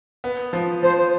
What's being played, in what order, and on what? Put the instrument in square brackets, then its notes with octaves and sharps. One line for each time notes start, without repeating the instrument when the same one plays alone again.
[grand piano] B3
F3
[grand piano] F3 [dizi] C5
[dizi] C5